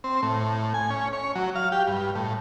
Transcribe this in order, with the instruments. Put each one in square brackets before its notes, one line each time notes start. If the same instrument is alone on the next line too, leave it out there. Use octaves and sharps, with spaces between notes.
[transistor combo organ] C4
A2
G#5
C#4
C#5
F#3
F5
G4
G2
A2